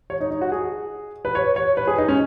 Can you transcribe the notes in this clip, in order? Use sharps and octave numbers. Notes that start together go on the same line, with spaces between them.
C#5
D#4
D#4
F#4
G#4
B4
C#5
C#5
B4
G#4
D#4
C#4